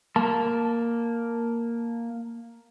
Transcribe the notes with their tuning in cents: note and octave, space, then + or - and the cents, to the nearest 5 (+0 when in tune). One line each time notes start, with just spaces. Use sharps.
A#3 +0 A5 +0